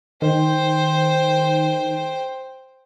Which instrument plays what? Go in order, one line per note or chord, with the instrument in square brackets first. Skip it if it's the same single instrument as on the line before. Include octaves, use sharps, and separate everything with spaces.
[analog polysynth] D#3 [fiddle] C5 G5